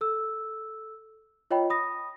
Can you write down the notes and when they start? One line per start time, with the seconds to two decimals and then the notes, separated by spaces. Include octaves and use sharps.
0.01 A4 E6
1.51 F4 C#5 D#5 G5 B5
1.70 B5 D#6 A#6